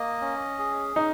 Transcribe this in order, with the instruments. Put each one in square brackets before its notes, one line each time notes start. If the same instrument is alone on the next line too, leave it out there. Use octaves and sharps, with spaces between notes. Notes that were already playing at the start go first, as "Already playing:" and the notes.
Already playing: [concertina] A#3 D#5
C#4
G#4
[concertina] C#4 [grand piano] D#4